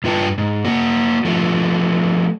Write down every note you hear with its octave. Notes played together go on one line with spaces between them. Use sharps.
G2 F4 B4 G5 A5
G#2
A#3 F#4
F3 A3 B3